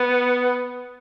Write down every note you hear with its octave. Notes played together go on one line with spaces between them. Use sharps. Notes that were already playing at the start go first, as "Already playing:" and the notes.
Already playing: B3